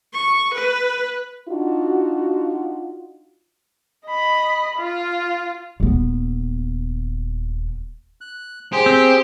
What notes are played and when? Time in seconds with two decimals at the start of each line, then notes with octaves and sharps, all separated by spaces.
0.13 C#6
0.55 B4
1.49 D4 D#4 F4 F#4
4.07 D#5 B5
4.78 F4
5.80 D#1 B3
8.21 F#6
8.73 G4 G#4 C5
8.86 C4